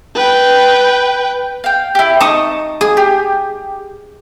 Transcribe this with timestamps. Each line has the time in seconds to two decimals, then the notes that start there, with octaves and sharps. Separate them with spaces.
0.15 B4 G5
1.64 F5 G5
1.95 E4 G4
2.20 D#4 A5 C#6 D#6
2.81 G#4 D#6
2.97 G4